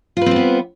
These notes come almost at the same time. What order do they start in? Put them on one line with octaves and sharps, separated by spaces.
F4 B4 C4 G3 B3